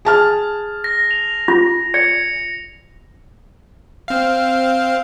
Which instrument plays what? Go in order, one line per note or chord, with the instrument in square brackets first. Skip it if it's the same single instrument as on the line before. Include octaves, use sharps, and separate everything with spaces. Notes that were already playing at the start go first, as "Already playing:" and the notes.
[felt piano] G#4 A5 F6
[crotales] A#6
F7
[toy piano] F4
[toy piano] D5 [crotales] C#7
[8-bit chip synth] C4 F5